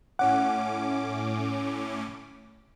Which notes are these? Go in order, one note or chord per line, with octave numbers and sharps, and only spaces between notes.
A2 C#4 F#5 D6